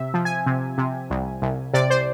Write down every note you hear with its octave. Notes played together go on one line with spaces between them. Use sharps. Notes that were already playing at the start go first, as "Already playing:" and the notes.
Already playing: C3 E5
F3
G#5
C3
C3
C2
C2
C3 D5
C5